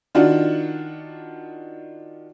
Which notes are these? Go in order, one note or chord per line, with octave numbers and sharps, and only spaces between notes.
D#3 D4 F4 F#4